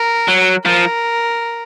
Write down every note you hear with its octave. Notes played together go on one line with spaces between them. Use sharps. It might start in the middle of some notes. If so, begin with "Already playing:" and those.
Already playing: A#4
F#3
F3 A#4